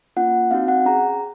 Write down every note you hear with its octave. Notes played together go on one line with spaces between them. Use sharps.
A#3 C#4 F4 F#5
C4 D#4 F#4 F5
F#5
C#4 G#4 A#5